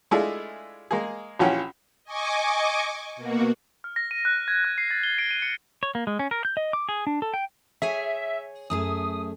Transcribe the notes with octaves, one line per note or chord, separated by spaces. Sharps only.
G#3 A3 D4 E4 F4 G#4
G#3 A#3 G#4
A#1 E3 F3 C#4 F#5 G5
D#5 G#5 C#6 D6
B2 A#3 F#4
F6
A#6
D#7
F#6
G#6
F#6
C7
A6
G7
D7
D#7
C#7
C#5
A#3
G#3
C#4
A#4
G6
D#5
D6
G#4
D4
A4
G5
G#4 C#5 E5 G#5
F#2 A3 G#4 D#6